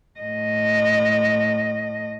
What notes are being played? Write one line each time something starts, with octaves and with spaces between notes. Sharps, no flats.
A2 D#5